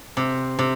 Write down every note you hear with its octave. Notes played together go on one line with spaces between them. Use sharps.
C3
C3